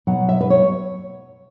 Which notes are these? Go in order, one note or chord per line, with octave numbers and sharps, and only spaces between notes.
B2 F#3 F#5
E5
B4
C#5